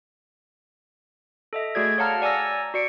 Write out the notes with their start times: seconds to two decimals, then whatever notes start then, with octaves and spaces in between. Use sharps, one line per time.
1.53 A4 D#5 E5
1.75 A3 F#4 G#4 D5 G#6
1.98 C#5 F5 F#5 A5 A#5 F6
2.22 D5 G#5 A#5 E6 A#6
2.74 F#4 D5 C#7 D7